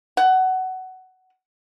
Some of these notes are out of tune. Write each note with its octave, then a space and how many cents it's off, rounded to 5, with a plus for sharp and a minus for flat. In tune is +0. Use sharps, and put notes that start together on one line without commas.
F#5 +15